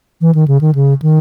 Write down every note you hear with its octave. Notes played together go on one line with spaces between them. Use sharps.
E3
D#3
C#3
D#3
C#3
D#3